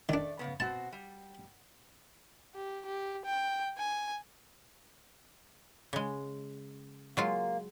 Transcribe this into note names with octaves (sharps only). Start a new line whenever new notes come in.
D#3 A3 D4 D5
C#3 B3
B2 C4 F#4 A5
G3
G4
G4
G5
G#5
C#3 G#3
F#3 G#3 A#3 F4